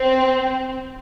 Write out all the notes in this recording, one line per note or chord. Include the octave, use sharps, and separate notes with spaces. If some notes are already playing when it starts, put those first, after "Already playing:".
Already playing: C4